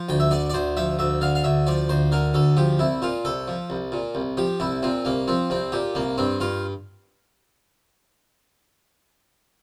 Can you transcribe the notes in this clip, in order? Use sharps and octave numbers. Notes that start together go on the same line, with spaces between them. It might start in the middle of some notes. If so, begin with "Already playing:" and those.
Already playing: F3
D2 G5
E5
D3 D5
D5
D2 C5
F3 E5
D2 E5
D3 F5
F5
D2 E5
F3 D5
D2 C5
D3 A#4
D2 A4
F3 G4
C2 E4
A#2 F4
C2 A4
F3
C2
A#2
C2
F3 G4
C2 E4
A#2 C4
C2 A#3
F3 C4
C2 C4
A#2 G4
C2 A#3
G2 C4
G2 F4